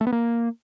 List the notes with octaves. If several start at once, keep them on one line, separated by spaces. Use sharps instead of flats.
A3
B3
A#3